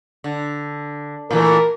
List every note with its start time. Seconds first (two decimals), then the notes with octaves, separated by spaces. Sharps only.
0.24 D3
1.31 A#2 E3 A3 A#4